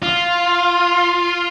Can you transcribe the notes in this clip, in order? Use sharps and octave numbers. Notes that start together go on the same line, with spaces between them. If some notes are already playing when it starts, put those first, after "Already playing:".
F4